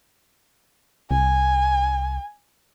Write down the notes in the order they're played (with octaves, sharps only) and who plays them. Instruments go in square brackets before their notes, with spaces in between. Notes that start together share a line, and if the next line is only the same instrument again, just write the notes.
[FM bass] C2 [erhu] G#5